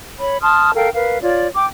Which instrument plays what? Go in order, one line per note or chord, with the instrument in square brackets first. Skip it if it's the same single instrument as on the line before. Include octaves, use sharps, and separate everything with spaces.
[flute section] C#5 B5
A5 C6 D#6 F6
A4 A#4 F5 G5
A#4 B4 F5
F4 C#5 D5
G5 D6